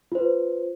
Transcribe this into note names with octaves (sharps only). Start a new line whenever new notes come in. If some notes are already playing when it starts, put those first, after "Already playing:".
F4 B4 C5